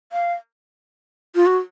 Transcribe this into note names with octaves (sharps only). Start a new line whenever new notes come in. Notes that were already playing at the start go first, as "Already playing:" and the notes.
F5
F4
F#4